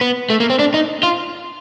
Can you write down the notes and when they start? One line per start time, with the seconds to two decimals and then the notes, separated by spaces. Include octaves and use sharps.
0.01 B3
0.30 A3
0.40 A#3
0.50 C4
0.59 D4
0.74 D#4
1.03 F4